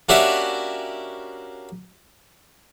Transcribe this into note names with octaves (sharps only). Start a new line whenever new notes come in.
A#3 C#4 D4 F#4 G4 E5